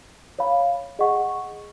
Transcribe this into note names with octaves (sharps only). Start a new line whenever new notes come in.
C#5 F5 B5
G#4 D#5 F#5 C#6